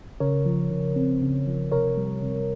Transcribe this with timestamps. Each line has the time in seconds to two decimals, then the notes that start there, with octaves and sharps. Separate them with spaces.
0.20 C#3 A#4 C#5
0.45 F3
0.71 C#3
0.96 C4
1.21 C#3
1.47 F3
1.72 C3 A#4 C#5
1.97 G3
2.23 C3